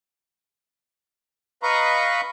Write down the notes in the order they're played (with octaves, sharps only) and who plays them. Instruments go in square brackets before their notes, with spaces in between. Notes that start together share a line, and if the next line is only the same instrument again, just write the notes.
[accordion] B4 D#5 F5 A#5 B5 C#6